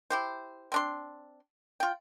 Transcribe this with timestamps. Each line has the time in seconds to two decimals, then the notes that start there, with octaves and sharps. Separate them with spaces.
0.10 E4 G4 C5
0.72 C4 D4 C6
1.80 F4 G5